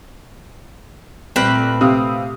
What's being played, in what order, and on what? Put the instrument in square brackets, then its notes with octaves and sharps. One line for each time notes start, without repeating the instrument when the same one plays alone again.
[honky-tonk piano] C2 [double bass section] A#2 A3 [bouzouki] C4 B4
[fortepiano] C3 [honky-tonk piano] F5 D#6 E6